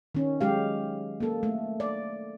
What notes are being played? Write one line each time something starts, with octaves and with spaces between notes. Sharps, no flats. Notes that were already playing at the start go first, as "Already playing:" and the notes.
D#3 C#4
F#3 G#3 G4 F5
A#3 A4
A3
D5